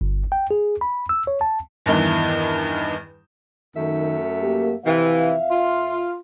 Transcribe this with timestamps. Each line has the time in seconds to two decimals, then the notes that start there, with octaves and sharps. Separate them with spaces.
0.01 G1
0.32 G5
0.51 G#4
0.81 B5
1.09 E6
1.27 C#5
1.41 A5
1.86 E2 G2 D#3 E3
3.76 F#2 D#3 A3 E5
4.42 A#3 G4
4.85 F2 C3 E3 E5 F5
5.51 F4